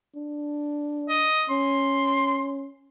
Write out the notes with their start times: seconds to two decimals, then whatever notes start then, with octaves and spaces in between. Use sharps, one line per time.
0.16 D4
1.09 D#5
1.50 C#4 C6